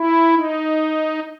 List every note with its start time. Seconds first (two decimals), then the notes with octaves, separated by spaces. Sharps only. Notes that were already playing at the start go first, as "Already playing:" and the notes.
Already playing: E4
0.34 D#4